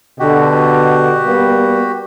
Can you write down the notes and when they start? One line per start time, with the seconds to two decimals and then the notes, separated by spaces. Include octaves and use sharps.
0.20 B2 D3 F#4 G4
1.25 G3 A#3 B3